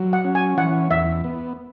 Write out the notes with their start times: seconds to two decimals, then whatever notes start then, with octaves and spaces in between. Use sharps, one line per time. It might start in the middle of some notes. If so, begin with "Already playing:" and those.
Already playing: F#3
0.13 F#5
0.25 C#4
0.35 G#5
0.57 E3 F#5
0.91 E2 E5
1.24 B3